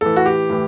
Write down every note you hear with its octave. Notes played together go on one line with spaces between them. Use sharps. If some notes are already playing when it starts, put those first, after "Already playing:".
A2 E3 A4
F#4
G4
A2 E3